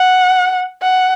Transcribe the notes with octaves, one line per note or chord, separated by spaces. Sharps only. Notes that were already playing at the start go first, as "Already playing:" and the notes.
Already playing: F#5
F#5